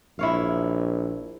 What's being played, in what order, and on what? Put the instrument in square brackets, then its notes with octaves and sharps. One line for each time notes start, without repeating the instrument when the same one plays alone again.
[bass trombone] A#1 [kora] E4 C#5 F5